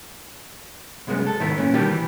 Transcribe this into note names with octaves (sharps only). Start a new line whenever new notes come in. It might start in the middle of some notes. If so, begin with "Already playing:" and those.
C2 F#2 C#3 G#3 B3
A4
G#2 D#3 A3 B3 E4
F#2 A#2 E3 C#4
B2 D#3 G3 D4 G4
E3